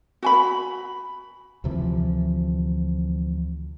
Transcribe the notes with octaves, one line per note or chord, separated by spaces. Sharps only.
F#4 G#5 B5
D2 C3 E3 F3